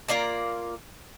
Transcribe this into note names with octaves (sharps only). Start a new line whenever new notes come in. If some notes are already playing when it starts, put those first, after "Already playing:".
A#3 F4 D5 A#5